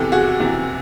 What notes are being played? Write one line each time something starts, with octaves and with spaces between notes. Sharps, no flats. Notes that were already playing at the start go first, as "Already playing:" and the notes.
Already playing: E2 C3 E3 G4 A4
F#4 G#4
E2 C3 E3